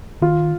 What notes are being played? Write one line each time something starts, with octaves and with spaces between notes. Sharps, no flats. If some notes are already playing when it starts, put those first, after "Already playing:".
D#3 F4